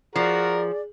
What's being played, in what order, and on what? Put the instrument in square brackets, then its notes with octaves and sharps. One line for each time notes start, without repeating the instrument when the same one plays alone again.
[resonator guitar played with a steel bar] F3 [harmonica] F#4 A#4 [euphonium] G#4 [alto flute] D5